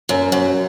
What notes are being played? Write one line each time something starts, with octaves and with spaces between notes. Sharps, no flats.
F#2
F#2